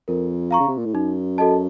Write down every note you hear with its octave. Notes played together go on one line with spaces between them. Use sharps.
F2 A#4
F5 A#5 C#6
C#3
C3
A#2
A2
F#2 D#4
F#4 A4 D#5 A5